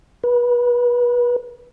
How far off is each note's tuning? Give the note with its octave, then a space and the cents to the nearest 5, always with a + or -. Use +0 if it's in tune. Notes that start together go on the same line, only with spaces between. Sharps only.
B4 -30